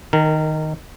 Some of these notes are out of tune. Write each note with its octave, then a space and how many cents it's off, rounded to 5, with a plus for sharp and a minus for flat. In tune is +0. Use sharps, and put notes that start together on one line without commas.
D#3 +0 A#4 -20